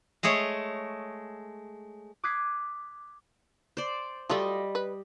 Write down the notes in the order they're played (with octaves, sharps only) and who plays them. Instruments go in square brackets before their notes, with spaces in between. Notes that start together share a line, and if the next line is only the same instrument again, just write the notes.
[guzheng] G#3 A3 G#4 C#5
[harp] D6 D#6 F#6 G#6 B6 C7
[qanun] C5 D5
[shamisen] F#3 A3 F4 [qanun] G3 D#5
[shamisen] B4